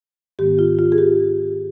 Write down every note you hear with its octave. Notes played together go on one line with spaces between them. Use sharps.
G#2 D#3 G#3 B3 G4
F4
F4
G#4
G4